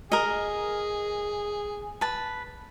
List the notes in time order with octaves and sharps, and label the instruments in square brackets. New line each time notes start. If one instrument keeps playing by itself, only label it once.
[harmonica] G#4 [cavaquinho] A#4 D#5
[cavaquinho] B4 A5